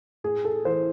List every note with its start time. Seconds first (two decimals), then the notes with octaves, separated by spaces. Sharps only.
0.24 A2 G#4
0.45 A4
0.65 E3 C5